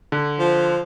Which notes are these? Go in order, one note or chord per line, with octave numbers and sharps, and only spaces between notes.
D3
F3